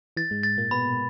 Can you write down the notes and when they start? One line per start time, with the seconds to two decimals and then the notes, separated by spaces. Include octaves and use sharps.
0.17 E3 A6
0.31 G#2 G#3
0.43 A6
0.58 A#2 A#3
0.71 B2 B3 B5